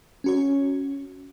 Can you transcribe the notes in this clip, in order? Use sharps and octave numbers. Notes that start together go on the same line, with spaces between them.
C#4 F#4 C#5